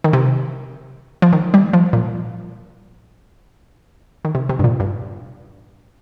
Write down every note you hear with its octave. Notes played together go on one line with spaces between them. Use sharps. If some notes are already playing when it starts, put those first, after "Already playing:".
D#3
C3
F3
D#3
G3
F3
A#2
D#3
C3
C3
G2
A#2
G2